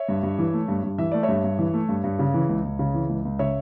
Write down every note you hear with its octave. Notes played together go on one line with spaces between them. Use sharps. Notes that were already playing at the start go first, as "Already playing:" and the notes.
Already playing: C#5 E5
G2
G2
E3
A3
G2
G2
E3 E5
A3 D5
C#5 E5
G2
G2
E3
A3
G2
G2
C#3
E3
C#2
C#2
C#3
E3
C#2
C#2
C#3 C#5 E5